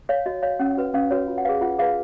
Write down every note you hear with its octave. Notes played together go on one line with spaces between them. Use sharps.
C#5 F5
F#4 D#5
C#5 F5
C#4 F#5
F#4 B4
C#4 F5
F#4 B4 C#5
F4
F#5
G#4 B4 F5
F4 F#5
G#4 B4 F5